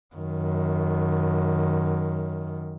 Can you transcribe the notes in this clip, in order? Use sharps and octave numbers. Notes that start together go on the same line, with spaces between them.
F#2 D#3